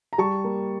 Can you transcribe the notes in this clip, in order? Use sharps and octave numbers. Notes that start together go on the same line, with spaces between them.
A#5
G3 A5 C#6
A#3